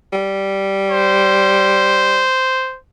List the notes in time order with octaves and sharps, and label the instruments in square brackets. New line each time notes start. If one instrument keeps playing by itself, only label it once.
[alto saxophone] G3
[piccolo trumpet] C5